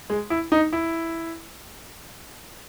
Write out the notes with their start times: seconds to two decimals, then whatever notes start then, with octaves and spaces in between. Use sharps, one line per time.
0.10 G#3
0.30 E4
0.52 D#4
0.73 E4